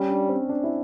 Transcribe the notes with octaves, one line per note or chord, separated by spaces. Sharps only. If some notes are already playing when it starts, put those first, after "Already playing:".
Already playing: G3 C#4
D4
C4
D4
E4